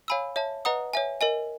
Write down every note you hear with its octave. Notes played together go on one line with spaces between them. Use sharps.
C#5 F5 G#5 B5 E6
C#5 E5 A5
B4 D#5 F#5 A#5 D#6
C#5 E5 G#5
A#4 D#5 G#5